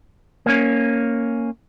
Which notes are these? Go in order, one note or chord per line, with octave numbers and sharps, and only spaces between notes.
A#3 C#4